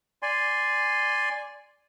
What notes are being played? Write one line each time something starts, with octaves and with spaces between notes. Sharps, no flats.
D5 G#5 C6